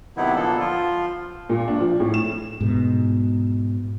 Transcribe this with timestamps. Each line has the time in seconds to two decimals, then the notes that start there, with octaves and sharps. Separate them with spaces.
0.17 C3 D#3 F#3 B3 D#4 E4
0.35 A#2 D3 F3 A#3 B3 A4
0.59 F3 F4
1.49 A#2
1.68 D4
1.80 F3
2.00 A2
2.14 E7
2.61 G#2 B2